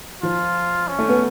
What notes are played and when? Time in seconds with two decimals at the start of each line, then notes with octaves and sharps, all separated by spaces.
0.22 F3 F4
0.88 C#4
0.99 A3
1.09 B3